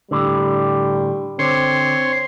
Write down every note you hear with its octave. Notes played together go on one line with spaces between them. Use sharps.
A2 D3 G3
D3 C4 C#5 C6